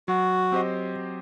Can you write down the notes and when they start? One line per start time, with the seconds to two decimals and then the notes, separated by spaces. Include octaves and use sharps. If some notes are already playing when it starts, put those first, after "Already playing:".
0.08 F#3 F#4
0.52 C4 G4 C5 D#5
0.96 F#3